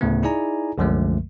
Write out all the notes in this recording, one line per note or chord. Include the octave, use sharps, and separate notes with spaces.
D2 A2 C#3 A3 B3
D#4 E4 G#4 D5 G#5 A#5
C2 F#2 D3 F3 G#3 A3